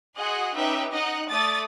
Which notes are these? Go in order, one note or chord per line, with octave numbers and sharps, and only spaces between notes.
F#4 G#4 D#5 F#5 C6
C#4 D#4 G4 B4 E5 G5
D#4 D#5 F#5
A3 D5 D#6 A6